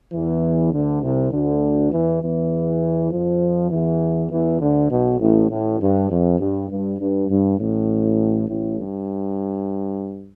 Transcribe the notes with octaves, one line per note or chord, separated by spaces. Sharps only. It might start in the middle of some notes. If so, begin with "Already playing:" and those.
E2 E3
D2 D3
C2 C3
D2 D3
E2 E3
E2 E3
F2 F3
E2 E3
E2 E3
D2 D3
B1 B2
A1 A2
A1 A2
G2
F2
G2
G2
G2
G2
A1 A2
A1 A2
G2